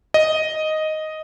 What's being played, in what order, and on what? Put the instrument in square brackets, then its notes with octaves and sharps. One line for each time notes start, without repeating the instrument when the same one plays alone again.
[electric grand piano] D#5